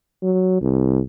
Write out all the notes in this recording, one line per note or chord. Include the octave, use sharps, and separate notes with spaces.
F#3
C2